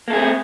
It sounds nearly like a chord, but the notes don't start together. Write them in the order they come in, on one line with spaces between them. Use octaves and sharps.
A#3 A4 G#4 C4 A3